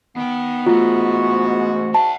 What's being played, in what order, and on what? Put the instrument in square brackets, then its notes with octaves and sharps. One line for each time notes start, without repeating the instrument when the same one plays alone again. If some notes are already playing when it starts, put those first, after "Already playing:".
[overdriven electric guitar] D#3 G5 [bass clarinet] B3
[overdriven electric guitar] E2 A3 [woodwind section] G#2 F#4 [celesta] F4
[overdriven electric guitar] E5 F#5 [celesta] A5